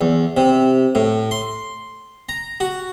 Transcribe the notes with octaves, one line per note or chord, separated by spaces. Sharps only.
E2
C3
A2
C6
A#5
F#4